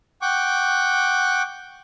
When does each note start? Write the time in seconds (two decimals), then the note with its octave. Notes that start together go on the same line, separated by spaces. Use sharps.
0.22 F#5 G5 C#6 D6